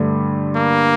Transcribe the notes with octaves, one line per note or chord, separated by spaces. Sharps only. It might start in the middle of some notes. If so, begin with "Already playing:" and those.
Already playing: G2 D3 A3
A#3